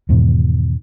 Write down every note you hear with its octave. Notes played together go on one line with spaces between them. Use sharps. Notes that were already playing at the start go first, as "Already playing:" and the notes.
E2 G#2 B2 D#3